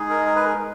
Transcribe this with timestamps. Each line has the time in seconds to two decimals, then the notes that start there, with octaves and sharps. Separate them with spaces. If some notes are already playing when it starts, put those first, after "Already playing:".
Already playing: G#3 D#4 G#4
0.10 A#4
0.26 A#4
0.36 B4
0.45 A#4